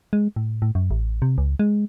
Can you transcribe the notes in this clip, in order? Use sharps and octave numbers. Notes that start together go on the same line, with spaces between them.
G#3
A2
A2
F#2
A1
C3
C#2
G#3